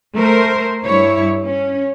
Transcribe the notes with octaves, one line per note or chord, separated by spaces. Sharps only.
A3 A#4 C5
G2 E4 C#5
C#4